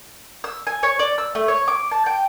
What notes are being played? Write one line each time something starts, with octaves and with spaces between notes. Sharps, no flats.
E6
G#5
C#5
D5
E6
A3
C#5
D6
A5
G5